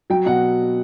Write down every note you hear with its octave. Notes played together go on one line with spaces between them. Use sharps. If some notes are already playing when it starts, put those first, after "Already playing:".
F#3 G5
B2 F#5